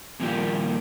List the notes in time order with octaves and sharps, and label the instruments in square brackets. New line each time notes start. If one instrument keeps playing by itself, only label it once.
[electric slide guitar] A#2 D#3 F3 G3 A#3 G4